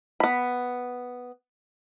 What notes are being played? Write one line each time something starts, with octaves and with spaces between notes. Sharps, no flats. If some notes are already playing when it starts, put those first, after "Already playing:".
B3 B5